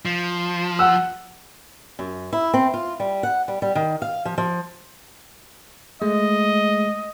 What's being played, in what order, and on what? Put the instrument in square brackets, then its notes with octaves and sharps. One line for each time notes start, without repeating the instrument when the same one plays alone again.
[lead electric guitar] F3
[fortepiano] F#5 E6
[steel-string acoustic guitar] F#2
E4
C4
F4
G3
F#5
G3
G3
D#3
F5
F3
F3
[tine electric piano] G#3 A3 [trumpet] D#5